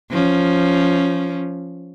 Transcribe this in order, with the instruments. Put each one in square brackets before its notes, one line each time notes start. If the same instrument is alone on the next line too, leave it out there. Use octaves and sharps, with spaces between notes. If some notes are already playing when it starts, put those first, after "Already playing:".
[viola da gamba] F3 C#4